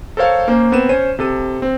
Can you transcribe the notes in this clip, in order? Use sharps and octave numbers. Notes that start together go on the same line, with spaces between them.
A4 A#4 C5 C#5 F5
A#3 C#4 C5
B3 C4 A#4 D#7 E7
C#4 C5 C#5 D#7
C3 A4 D#7
C4